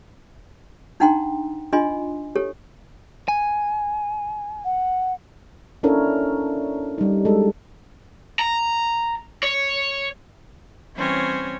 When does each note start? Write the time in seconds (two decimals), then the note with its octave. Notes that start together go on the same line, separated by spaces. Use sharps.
1.00 D4 D#4 F#5 G5 A#5 C6
1.72 D4 F4 D#5 G#5 B5 C6
2.35 G4 A4 C#5
3.28 G#5
4.64 F#5
5.83 C#4 D4 E4 A4 A#4 C#5
6.98 G3 D#4
7.25 G#3 A4
8.39 A#5
9.43 C#5
10.97 E3 G3 C4 C#4 C5 C#5